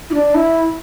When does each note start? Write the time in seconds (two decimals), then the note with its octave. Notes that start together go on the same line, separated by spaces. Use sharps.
0.10 E4
0.13 D4
0.34 E4